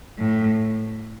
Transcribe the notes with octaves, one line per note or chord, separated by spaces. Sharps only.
A2